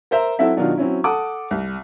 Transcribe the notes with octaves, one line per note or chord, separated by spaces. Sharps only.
A#4 C5 E5 A#5
F#3 C4 E4 F#4 A4 E5
B2 D#3 F#3 D4 D#4 F4
F#3 C4 C#4 E4
A4 F#5 A5 D6 D#6
C2